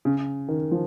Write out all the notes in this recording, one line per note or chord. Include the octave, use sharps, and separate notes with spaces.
C#3
D#3
F3